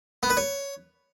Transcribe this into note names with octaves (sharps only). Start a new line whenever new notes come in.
B3
B4
C#5